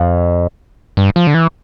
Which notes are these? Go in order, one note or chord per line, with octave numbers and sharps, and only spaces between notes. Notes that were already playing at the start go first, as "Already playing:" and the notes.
Already playing: F2
G2
F3
D3
E3